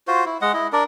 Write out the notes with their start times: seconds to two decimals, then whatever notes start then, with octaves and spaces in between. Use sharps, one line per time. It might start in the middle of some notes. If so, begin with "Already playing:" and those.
0.08 F4 F#4 C5
0.26 E4
0.41 G#3 D#5 F#5
0.54 E4 D#5
0.73 D4 A#4 D5